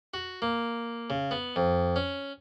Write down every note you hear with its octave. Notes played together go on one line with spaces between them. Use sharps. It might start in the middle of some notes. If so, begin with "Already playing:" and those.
F#4
A#3
C#3
B3
F2
C#4